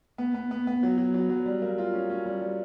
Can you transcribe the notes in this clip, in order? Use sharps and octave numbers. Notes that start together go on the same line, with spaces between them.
B3
B3
B3
B3
F#3
F#3
F#3
F#3
G3
A#3
F4
C#4
C#4
G3
G3